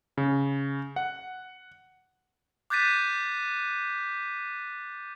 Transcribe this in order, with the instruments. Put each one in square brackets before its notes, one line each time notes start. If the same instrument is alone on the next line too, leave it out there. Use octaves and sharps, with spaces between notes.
[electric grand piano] C#3
F#5
[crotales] D6 F#6 G6 A6 B6 D#7